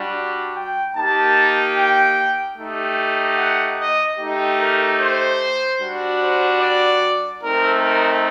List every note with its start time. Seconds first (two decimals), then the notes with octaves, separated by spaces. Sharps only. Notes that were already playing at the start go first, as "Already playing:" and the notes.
Already playing: G3 D4 F#4
0.56 G5
0.96 A#3 D#4 G4 A5
1.77 G5
2.58 A3 D#4 G4
3.38 F#5
3.78 D#5
4.19 A3 D#4 G4
4.59 A#4
4.99 C5
5.81 G3 D4 F#4
6.21 C5
6.61 D5
7.42 A3 C4 D#4 A#4
7.83 A#4